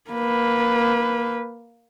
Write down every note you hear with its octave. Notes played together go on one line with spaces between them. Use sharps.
A#3 B4